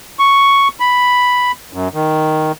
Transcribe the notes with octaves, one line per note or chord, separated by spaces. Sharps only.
C#6
B5
F#2
D#3